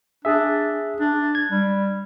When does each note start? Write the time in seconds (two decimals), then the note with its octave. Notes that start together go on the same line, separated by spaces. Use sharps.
0.25 D4 G#4 E5
1.00 D4
1.35 G#6
1.51 G3